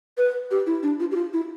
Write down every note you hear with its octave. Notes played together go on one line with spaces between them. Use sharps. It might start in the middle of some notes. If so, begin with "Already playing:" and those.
B4
G4
E4
D4
F4
G4
F4
E4